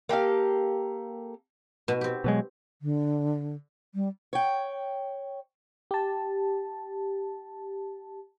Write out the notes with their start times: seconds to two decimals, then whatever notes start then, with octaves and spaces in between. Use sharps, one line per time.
0.09 A#3 G4 A4 F5
1.88 B2
2.01 C4 G4
2.24 B2 F#3 G#3
2.82 D3
3.95 G3
4.33 C#5 G5
5.91 G4 A5